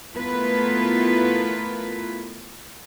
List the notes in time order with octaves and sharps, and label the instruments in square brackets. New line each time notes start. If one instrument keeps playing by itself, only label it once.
[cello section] A3 B3 E4 F4 A#4 B4